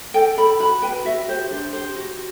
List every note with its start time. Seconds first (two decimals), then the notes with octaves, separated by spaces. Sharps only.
0.14 A4 G5
0.37 A4 B5
0.60 F#4 B5
0.82 B4 G5
1.05 F#4 E5
1.28 G4 C5
1.51 D4 C5
1.73 G4 C5
1.96 F#4